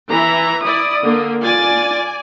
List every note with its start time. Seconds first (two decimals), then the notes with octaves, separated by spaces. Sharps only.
0.10 E3 E5 A#5
0.64 E4 D5 D#6
1.04 D3 A#3
1.42 F4 D5 G#5 A6